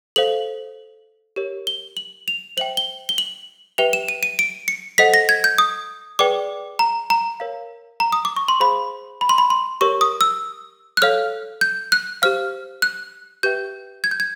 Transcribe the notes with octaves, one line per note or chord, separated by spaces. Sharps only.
A4 C5 F5 F#7
G4 A#4 C#5
G7
F#7
F7
C5 E5 G5 F#7
G7
G7
F#7
G4 B4 E5 G5 F7
E7
D#7
D#7
D7
C#7
A4 C5 D#5 F#5 B6
A#6
G#6
G6
D#6
G#4 B4 D5 G5 D6
A#5
A#5
A#4 C#5 F5
A#5
D#6
D6
C#6
C6
G#4 C5 F5 B5
B5
C6
B5
C6
G4 A#4 C#5 C#6
D#6
E6
F#6
A4 C#5 F5 F6
G6
F#6
G4 C5 F5 F6
F#6
G4 B4 E5 G5 G6
G#6
G6
G#6